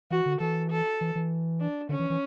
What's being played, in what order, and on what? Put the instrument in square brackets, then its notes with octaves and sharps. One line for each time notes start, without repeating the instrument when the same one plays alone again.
[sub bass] E3 [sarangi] F#4
[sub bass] D3
[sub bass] E3 [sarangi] A4
[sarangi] A4
[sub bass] E3
E3
[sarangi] D4
[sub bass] D3 [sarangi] C#4
[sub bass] E3
E3